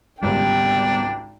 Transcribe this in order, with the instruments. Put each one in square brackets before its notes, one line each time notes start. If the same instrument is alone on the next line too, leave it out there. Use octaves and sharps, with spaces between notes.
[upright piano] G#1 C#2 C3 [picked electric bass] G3 B3 [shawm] D4 [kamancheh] G5